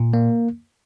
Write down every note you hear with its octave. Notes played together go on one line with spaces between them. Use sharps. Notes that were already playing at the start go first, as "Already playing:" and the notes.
Already playing: A#2
A#3